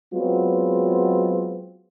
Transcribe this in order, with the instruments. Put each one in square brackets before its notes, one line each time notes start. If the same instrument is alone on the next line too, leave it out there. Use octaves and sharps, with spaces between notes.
[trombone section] F#3 G#3 B3 C4 F4